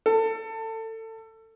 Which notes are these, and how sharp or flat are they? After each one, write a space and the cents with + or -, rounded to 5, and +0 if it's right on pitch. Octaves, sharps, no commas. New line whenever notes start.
A4 +25